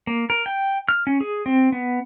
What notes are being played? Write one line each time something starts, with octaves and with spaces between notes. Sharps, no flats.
A#3
A#4
G5
F6
C#4
G#4
C4
B3